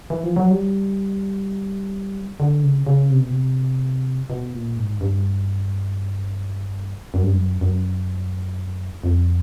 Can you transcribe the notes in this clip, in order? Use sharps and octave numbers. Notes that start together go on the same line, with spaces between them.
E3
F3
F#3
G3
D3
C#3
C#3
C3
B2
C3
B2
A#2
G#2
G2
F#2
G2
F#2
F#2
F2